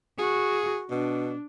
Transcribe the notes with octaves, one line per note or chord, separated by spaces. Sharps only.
F#4 G#4
B2 D4